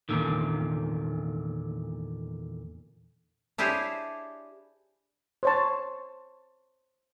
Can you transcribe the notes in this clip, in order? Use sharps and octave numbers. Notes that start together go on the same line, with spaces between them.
E2 G2 A#2 D3 D#3
D4 E4 G4 G#4 C5 C#5
C5 C#5 A5